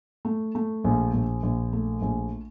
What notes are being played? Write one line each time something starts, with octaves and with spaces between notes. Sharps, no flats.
A3
A3
A#1
A#1
A#1
A3
A#1